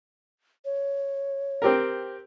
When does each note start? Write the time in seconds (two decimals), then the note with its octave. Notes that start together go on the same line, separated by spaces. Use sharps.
0.65 C#5
1.62 C4 G4 A#4